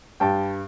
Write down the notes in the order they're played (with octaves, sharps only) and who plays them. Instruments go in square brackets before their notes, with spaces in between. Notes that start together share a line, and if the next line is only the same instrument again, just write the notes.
[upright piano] G2 G5 A5